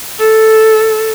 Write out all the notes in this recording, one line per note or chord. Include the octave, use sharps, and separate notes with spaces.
A4